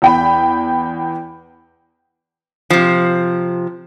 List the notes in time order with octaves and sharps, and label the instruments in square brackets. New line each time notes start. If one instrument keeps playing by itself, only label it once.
[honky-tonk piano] E2 G5 B5
[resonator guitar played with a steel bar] C3 F3